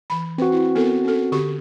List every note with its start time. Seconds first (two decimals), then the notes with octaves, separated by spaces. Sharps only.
0.10 E3 B5
0.38 C4 F#4 B4
0.52 E4
0.75 B3 A4 A#4
1.04 C#4 A4
1.32 D3 G4 C#6